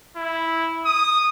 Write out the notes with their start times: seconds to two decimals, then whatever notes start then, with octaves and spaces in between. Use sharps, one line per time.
0.16 E4
0.85 D#6